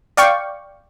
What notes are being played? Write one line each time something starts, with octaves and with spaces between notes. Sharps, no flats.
D5 F5 G5 C#6